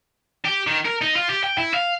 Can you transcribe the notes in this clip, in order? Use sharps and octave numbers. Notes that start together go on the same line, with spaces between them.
G4
D#3
A#4
D#4
F4
G4
G5
E4
F5